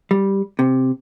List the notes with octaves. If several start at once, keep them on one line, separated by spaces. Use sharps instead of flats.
G3
C3